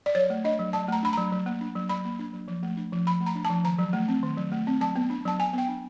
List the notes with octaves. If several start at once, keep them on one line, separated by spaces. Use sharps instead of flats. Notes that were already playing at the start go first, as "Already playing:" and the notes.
D5
F#3 C#5
A3
D4 D#5
F#3
F#3 A5
A3 A#5
D4 B5
F#3 A#5
F#3
A#3
D4
F#3
F#3 B5
A#3
D4
F#3
F3
A3
D4
F3
F3 B5
A3
A#5
D4
A5
F3
D#3 A#5
F#3
A3
C4
D#3
F#3
A3
C4
F#3 A5
B3
D4
F#3 A5
F#3 G#5
B3 G5
D4